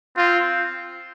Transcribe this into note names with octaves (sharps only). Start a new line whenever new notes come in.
C4 F4